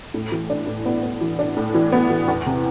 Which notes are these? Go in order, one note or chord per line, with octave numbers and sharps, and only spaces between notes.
A2
E3
D4
A2
B3
B3
E3
D4
A2
E3
B3
E3
E2
C3